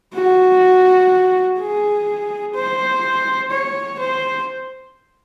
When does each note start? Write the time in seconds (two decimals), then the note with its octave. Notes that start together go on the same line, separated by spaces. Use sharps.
0.15 F#4
1.59 G#4
2.55 C5
3.51 C#5
4.00 C5